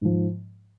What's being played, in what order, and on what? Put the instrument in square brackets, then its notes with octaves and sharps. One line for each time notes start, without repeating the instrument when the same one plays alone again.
[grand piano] G#2 F3